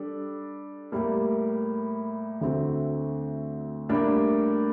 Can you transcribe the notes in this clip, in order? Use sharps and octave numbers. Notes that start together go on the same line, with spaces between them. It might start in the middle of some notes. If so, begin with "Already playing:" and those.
Already playing: G3 D4 A4
A2 G3 A#3
D2 D3 A3 C4 F#4
A2 G3 A#3 D4